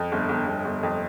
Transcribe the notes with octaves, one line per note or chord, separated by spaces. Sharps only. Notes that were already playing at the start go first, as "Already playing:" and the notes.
Already playing: F2
G1
G1
G1
G1
F2